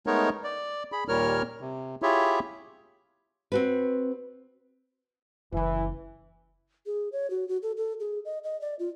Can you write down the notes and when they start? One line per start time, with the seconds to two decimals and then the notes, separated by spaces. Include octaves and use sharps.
0.06 G#3 A3 B3 D#4 A#4 C#5
0.44 D5
0.92 G#4 B5
1.08 D#2 A#2 G3 A#4 C#5 F6
1.61 C3
2.02 E4 F4 G4 G#4 C#5 E5
3.52 C4 F#4 B4
5.52 F#1 F#2 E3
6.86 G#4
7.12 C#5
7.30 F#4
7.48 F#4
7.63 A4
7.77 A4
8.00 G#4
8.25 D#5
8.44 D#5
8.61 D5
8.79 F4